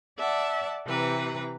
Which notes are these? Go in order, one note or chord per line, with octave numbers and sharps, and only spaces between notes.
D5 E5 F#5 A5
C3 E3 B4 A#5